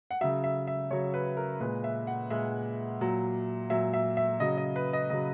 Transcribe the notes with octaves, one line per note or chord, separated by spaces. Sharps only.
F#5
C#3 F#3 E5
E5
E5
C#3 F#3 C#5
B4
A#4
A#2 G#3 B4
E5
F#5
A#2 G#3 E5
A#2 F#3
A#2 F#3 E5
E5
E5
C#3 F#3 D#5
D#5
B4
D#5
C#3 F#3 D#5